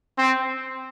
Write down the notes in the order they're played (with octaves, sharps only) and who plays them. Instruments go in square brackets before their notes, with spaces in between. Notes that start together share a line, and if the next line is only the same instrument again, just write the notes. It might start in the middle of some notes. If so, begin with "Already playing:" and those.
[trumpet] C4